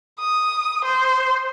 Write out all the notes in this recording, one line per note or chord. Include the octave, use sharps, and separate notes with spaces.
D#6
C5